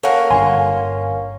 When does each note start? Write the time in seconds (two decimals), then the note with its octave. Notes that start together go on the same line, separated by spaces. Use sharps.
0.03 A#3 C#4 A4 F5 F#5
0.31 G1 G2 F5 G#5 C6